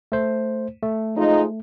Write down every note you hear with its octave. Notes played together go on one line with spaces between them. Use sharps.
A3 C5
A3
F3 G#3 D#4